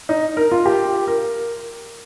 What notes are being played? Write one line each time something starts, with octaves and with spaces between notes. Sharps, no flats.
D#4
A#4
F4
G4
A#4